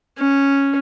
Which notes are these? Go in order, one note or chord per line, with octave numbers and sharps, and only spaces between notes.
C#4